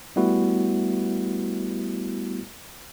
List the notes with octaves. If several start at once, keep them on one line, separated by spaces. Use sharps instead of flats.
G3 A3 B3 E4 F#4